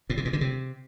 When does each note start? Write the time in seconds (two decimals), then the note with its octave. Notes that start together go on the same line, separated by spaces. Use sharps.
0.10 A2
0.17 C3
0.25 A#2
0.33 D3
0.41 C3